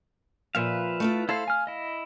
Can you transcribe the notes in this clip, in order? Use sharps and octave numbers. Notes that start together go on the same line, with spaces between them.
A#2 F3 B4 E5 F5
A3 E4 F4
E4 A4 C5 F5
G#5 F6
E4 D#5